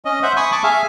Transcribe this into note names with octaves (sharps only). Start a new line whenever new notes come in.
C#4 D#5
C5 E5 F#5
G#5 B5 C#6 D#6
A5 C#6 D6
G#4 E5 F5 G#5